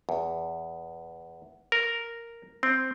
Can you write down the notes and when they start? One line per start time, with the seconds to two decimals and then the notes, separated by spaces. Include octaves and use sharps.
0.09 E2
1.72 A#4
2.63 C4